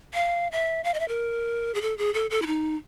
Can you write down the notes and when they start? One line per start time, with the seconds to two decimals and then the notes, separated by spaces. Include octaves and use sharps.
0.14 F5
0.52 E5
0.84 F5
0.94 D#5
0.99 E5
1.08 A#4
1.74 G#4
1.81 A4
1.98 G#4
2.14 A4
2.30 A4
2.42 E4
2.46 D#4